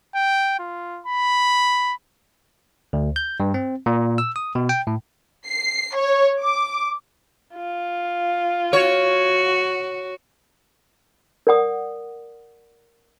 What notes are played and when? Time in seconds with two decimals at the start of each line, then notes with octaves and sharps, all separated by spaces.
0.15 G5
0.59 F4
1.06 B5
2.93 D2
3.16 G6
3.40 G2
3.54 C4
3.86 A#2
4.18 E6
4.36 D#6
4.55 B2
4.69 G5
4.87 A2
5.46 C7
5.95 C#5
6.41 D6
7.55 F4
8.73 F#4 C#5
11.47 A#4 D5 F#5 D#6